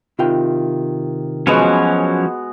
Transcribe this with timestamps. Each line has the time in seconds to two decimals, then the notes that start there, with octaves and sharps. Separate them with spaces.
0.19 C3 D#3 E4 F4 G5
1.47 F3 F#3 G#3 B3 C#4 F#4